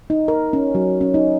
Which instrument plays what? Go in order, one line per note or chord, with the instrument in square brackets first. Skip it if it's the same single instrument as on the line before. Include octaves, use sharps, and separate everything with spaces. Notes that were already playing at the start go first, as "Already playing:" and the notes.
[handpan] D#4
A#4
C#4
F#3
C#4
D#4